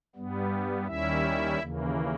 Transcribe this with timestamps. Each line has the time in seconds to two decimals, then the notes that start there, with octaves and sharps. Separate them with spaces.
0.16 G2 G3 B3
0.87 D#2 D#3 G3 C#4 E4 E5
1.59 D#2 C#3 E3 A#3